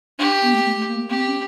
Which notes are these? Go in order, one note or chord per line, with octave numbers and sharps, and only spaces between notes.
D4 G4
B3
A3
A3
A3
A#3
A#3
C4 G4
C#4